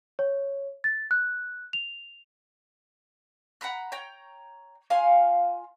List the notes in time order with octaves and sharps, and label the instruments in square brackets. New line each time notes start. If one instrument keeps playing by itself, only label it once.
[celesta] C#5
A6
F#6
F7
[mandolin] F#5 A#5 B5 F#6
C#5 G5 A#5
F4 F5 G#5 C6